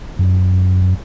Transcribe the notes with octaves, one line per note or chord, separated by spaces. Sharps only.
F#2